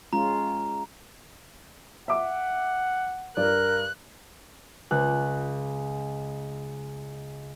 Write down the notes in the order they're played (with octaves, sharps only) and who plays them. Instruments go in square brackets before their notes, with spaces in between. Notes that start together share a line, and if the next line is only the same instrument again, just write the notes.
[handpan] G#3 C#4 F4 [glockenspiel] A#5
[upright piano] E5 D6 [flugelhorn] F#5
[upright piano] G2 D5 [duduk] A#4 [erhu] F#6
[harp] C#2 F#6